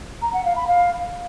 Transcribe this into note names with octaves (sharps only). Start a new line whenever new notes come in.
A#5
F#5
F5
B5
F5